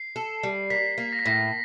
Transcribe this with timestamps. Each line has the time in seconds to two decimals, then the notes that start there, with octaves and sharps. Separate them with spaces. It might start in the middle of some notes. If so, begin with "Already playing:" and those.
Already playing: C7
0.16 A4
0.43 G3
0.70 A#3 B6
0.98 A#3
1.13 A#6
1.19 B6
1.26 A2 A#6